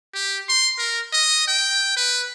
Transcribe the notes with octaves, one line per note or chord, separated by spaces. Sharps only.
G4
C6
A#4
D#5
G5
B4